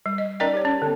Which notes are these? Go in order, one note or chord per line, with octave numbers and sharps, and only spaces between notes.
G3
D#5
C#4 D#4 A#4 D5 D#5 G5
G4 C#5
C#4
D3 B3